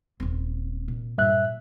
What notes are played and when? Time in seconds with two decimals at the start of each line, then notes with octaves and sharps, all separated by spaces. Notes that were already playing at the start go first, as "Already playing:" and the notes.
0.20 D#1 C4
0.88 A#2
1.18 G2 A#2 F#3 E5 F#6